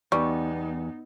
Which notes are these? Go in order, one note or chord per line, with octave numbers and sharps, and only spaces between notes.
E2 G3 B3 D#4 C#6